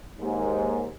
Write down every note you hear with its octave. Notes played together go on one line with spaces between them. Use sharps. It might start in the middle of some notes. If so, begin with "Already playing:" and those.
D#2 G#2